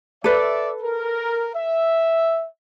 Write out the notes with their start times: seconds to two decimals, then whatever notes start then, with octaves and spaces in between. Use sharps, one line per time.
0.24 A4 B4 D5 E5
0.82 A#4
1.55 E5